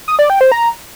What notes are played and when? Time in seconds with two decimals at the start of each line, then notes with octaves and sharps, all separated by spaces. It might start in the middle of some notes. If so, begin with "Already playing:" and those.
0.08 D#6
0.19 D5
0.30 G5
0.41 C5
0.52 A#5